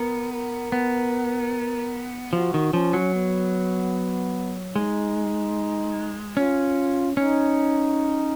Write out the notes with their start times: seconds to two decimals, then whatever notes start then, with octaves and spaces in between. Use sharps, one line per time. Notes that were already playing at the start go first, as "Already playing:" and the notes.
Already playing: B3 A#4
0.32 A#4
0.72 B3
2.33 F3 F#4
2.54 D#3
2.73 F3 C#4
2.93 F#3
3.14 B3
4.75 G#3 D#4
6.37 C#4 F4
7.17 C#4 D#4